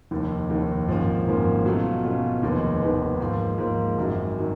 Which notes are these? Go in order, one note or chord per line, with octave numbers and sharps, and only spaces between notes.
F1 D#2 D#3
F1 D#2 D#3
G#1 G#2 F3 A#3 C#4
G#1 G#2 F3 A#3 C#4
B2 F#3 A3 C#4 F4
B2 F#3 A3 C#4 F4
F1 D#2 D#3 G#3 B3
F1 D#2 D#3 G#3 B3
G#2 F3 A#3
G#2 F3 A#3
G#1 F#2 D#3 F#3
D#3 F#3